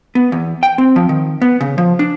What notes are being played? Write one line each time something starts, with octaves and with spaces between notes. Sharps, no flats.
B3
E2
G5
C4
F3
D#3
B3
C#3
F3
D4